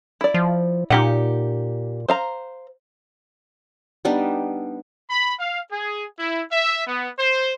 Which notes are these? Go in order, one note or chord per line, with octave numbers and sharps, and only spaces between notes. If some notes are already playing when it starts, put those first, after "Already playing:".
E4 D5
F3
A#2 D#4 G4 F#5
C5 F5 A#5
G3 B3 D4 D#4
B5
F5
G#4
E4
E5
B3
C5